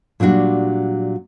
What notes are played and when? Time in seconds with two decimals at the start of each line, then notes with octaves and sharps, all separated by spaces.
0.20 A#2 F#3 G3 D4 F#4